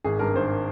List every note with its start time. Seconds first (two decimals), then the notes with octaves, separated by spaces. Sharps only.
0.04 G#1 G#4
0.19 G2 A#4
0.35 G#1 C5